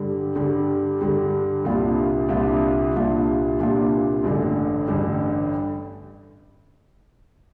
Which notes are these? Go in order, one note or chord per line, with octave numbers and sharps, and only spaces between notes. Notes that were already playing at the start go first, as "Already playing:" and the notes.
Already playing: G2 D3 G3
G2 D3 G3
G2 D3 G3
C2 A#2 G3 D4 F4
C2 A#2 G3 D4 F4
C2 A#2 G3 D4 F4
C2 A#2 G3 D4 F4
A1 G2 D3
A1 G2 D3